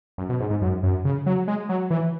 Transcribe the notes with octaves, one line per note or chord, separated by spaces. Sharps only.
F#2
B2
G#2
G#2
F#2
F#2
C#3
F#3
G#3
F#3
E3